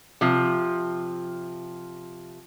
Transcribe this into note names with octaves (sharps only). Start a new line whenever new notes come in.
C3 F3